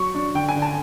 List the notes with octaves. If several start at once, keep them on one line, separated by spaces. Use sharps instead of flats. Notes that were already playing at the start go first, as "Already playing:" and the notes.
Already playing: F#3 C#6
D4
D3 G5
G#5
D3
A5